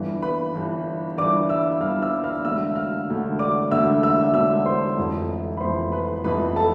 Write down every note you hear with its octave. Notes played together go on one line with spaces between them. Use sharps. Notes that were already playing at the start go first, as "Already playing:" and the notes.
Already playing: G1 G2 E3
B4 B5
G1 G2 E3
G1 G2 E3 D5 D6
E5 E6
G1 G2 E3 F5 F6
E5 E6
F5 F6
E1 D2 D3 E5 E6
F5 F6
E1 D2 D3
D5 D6
E1 D2 D3 E5 E6
E5 E6
E1 D2 D3 E5 E6
C5 C6
F1 F2 E3
B5
F1 F2 E3 C5 C6
B4 B5
F1 F2 E3 B4 B5
A4 A5